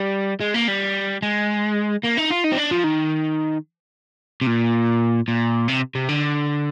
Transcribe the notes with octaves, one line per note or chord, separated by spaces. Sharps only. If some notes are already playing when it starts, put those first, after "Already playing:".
Already playing: G3
G#3
A#3
G3
G#3
A#3
D#4
F4
D#4
C4
D4
F3
D#3
C3
A#2
A#2
C3
C3
D3